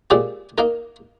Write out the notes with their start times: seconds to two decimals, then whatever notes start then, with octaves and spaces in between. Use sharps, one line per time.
0.10 A#2 G#3 C4 G4
0.58 A#3 D#4 A#4